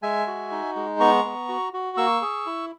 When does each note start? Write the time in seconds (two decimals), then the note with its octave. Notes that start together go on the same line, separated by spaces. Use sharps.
0.03 G#3 E5 G#5
0.27 F#4
0.51 D#4
0.76 G#3
1.00 B3 A#5 C#6
1.24 B3
1.49 F#4
1.73 F#4
1.97 A#3 C#6 E6
2.22 G#4
2.46 E4